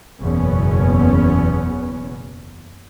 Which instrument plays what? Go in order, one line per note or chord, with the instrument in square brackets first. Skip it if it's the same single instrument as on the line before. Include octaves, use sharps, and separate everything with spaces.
[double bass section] F#1 E2 B2 B3 C#4